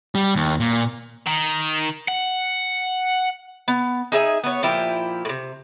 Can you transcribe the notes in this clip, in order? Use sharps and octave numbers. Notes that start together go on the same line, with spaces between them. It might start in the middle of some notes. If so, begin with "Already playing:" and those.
G3
D#2
A#2
D#3
F#5
B3
D#4 G#4 E5 G#5
B3 C#5
A#2 F3 E4 G4
A2 C3